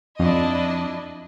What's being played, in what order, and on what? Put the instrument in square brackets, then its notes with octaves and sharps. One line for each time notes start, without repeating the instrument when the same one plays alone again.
[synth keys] F2 [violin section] D4 E4 D#5